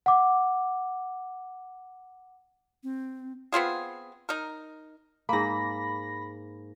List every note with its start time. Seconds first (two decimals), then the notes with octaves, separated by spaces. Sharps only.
0.06 F#5 D6
2.83 C4
3.52 B3 C4 F4 G#4
4.29 D#4 A#4
5.29 G#2 A#3 B5 A#6